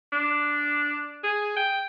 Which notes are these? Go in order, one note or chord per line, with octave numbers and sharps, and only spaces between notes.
D4
G#4
G5